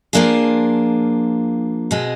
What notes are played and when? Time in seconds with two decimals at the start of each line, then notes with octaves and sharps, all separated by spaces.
0.13 F3 A#3 D4 F4 G#4
1.91 B2 G#3 C4